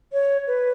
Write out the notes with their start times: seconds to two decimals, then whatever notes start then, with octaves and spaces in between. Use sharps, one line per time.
0.13 C#5
0.47 B4